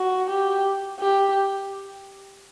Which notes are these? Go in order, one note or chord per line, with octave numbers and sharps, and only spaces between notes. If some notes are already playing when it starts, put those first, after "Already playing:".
Already playing: F#4
G4
G4